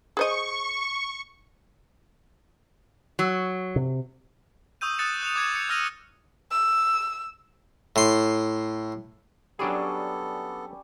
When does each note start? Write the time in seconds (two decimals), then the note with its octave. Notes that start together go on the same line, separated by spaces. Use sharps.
0.17 G#4 C5 D#5 C#6
3.19 F#3
3.76 C3
4.81 C#6 D#6 E6 G6 D#7
4.98 D#6 F#6 A6 C#7 E7
5.22 F#6 G6 E7 F7
5.36 D6 G#6 C#7
5.55 C#7
5.69 E6 F6 A#6 D#7 F7
6.51 E6
7.96 A2 C6
9.59 F#3 G3 B3 C#4 D4 G#4 A4